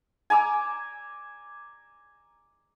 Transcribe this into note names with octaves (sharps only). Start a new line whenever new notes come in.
G#5 A#5 D6 E6